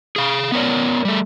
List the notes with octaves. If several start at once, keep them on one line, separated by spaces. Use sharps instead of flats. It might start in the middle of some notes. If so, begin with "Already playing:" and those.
G#4 F5
B3 A#4 C#5 D5
G3 A3